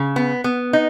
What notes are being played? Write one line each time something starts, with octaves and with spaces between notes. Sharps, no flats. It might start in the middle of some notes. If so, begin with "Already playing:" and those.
Already playing: C#3
B3
B3
D#4